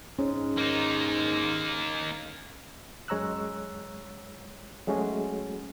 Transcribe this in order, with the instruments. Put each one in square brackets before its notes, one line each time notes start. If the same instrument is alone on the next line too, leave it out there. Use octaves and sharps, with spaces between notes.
[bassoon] G#2 [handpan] C#4
[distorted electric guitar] A#3 D#4
[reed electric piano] F#2 G#3 C#5 A#5 E6 F#6
F#3 G#3 A3 C#4 F#4 G#4